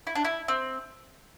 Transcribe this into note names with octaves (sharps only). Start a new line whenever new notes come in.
E4
D4
E4
C4